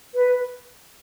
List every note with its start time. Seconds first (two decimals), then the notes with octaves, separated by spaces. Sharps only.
0.14 B4